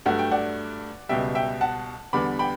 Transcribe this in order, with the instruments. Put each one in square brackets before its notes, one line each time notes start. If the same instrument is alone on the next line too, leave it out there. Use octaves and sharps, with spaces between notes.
[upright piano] G2 F#3 A3 F#5
G5
D5 F#5
C#2 B2 G3 E5 G5
E5 G5
F#5 A5
E2 D3 G3 B3 B5 D6
G5 B5